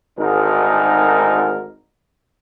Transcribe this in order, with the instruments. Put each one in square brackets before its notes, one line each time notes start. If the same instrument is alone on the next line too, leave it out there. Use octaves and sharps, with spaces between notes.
[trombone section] G#1 D2 G#2 D#4 A#4